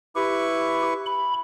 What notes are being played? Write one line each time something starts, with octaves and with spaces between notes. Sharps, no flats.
E4 G4 B4 C#6
B5